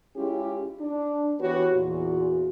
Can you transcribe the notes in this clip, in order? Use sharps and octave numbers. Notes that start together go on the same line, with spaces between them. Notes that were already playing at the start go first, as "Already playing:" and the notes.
G#3 C#4 E4 F4 G4 G#4
D4
E3 B3 F#4 G4 B4 C#5
E2 A#2 E3 F4 F#4